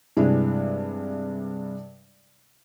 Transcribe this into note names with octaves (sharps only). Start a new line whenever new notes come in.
G2 C3 E3 G#3 D4 E4